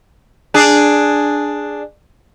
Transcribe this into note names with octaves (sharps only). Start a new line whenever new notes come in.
D4 G#4